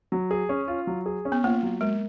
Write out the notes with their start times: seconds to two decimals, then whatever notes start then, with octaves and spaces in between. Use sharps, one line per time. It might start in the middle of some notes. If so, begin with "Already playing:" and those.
0.12 F#3
0.31 G#4
0.49 C#4
0.68 F4
0.87 F#3
1.06 G#4
1.25 C#4
1.32 B3
1.44 A#3 F4
1.63 F#3
1.81 G#3 A#4